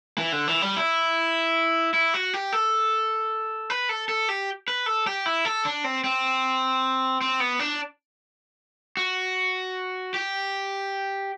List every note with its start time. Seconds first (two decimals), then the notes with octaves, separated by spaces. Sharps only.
0.18 E3
0.32 D3
0.48 E3
0.62 G3
0.77 E4
1.94 E4
2.14 F#4
2.34 G4
2.53 A4
3.70 B4
3.89 A4
4.09 A4
4.29 G4
4.68 B4
4.86 A4
5.07 G4
5.26 E4
5.45 A4
5.65 D4
5.84 C4
6.04 C4
7.21 C4
7.40 B3
7.59 D4
8.97 F#4
10.14 G4